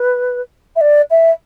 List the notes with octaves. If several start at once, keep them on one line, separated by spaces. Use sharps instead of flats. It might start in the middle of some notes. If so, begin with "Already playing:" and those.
Already playing: B4
E5
D5
E5